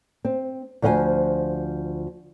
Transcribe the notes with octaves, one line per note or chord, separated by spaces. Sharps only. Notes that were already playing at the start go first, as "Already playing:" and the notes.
C4
D2 F3 C5 F5 G#5